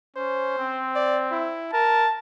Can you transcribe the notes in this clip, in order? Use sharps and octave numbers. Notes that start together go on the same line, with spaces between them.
C#4 C5
C4
D5
E4
A#4 A5